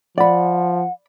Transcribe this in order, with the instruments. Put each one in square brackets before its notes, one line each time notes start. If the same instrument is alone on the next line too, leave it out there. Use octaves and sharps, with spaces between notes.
[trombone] F3 [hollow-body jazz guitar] D5 B5 [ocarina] F#5